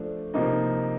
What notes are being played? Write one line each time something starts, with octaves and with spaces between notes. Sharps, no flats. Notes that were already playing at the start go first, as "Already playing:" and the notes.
Already playing: F3 A3 D4
C3 F3 A#3 D#4